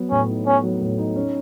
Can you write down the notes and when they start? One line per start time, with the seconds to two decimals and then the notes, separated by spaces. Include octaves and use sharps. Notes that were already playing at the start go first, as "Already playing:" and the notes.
Already playing: F#3 B3
0.11 A2 C#4
0.29 D#4
0.46 B3 C#4
0.63 F#3
0.81 A2
0.98 D#4
1.16 C#4